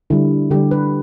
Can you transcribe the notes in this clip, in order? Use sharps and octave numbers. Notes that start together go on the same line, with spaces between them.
D3 G3 E4
D3 G3 G4
B4